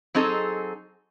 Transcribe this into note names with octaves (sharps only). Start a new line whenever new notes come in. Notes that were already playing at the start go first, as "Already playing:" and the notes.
F#3 C4 D#4 G#4 A4